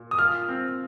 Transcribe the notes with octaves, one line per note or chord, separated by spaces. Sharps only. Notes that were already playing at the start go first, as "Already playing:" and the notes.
Already playing: A#2
D#6
F4 F6
C4